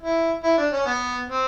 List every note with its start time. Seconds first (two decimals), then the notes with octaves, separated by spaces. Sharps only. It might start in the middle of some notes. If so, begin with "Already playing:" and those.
0.02 E4
0.44 E4
0.58 D4
0.73 C#4
0.86 B3
1.30 C4